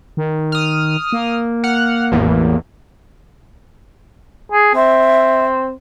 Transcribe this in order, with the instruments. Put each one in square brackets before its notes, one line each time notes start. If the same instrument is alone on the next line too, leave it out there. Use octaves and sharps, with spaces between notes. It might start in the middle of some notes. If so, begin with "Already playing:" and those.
[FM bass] D#3
[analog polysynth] D#6 F6
[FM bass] A#3
[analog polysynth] F#5 F6
A1 E2
[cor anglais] G#4
[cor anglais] C4 [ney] E5